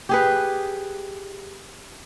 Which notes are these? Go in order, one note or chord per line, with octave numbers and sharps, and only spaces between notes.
G4 G#4 B4